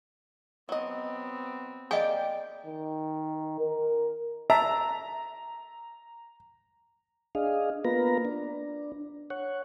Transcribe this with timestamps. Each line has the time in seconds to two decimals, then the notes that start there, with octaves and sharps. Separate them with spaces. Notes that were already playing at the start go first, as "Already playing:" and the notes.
0.69 F#3 B3 C4 D#5
1.91 A#3 G4 G#4 D5 D#5 G5 G#5
2.66 D#3
3.60 A#4
4.50 E5 A5 A#5
7.35 D4 G#4 D#5 F5
7.85 A#3 B3 F4 B4 A#5
8.25 D4
9.30 C#5 F#5